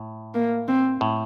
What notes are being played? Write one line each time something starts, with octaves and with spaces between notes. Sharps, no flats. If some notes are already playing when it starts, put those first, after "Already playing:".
Already playing: A2
A#3
C4
A2